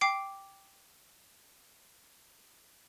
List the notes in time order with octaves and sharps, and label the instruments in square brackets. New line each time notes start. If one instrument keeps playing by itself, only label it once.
[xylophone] G5 D6 C7 D7